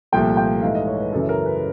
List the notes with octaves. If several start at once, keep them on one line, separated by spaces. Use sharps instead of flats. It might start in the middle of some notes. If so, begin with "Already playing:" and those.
C2 A#2 F3 A3 G5
G5
G#2 E3 A3 F5
D#5
C#5
B4
F#2 C#3 E3 A4
A#4
B4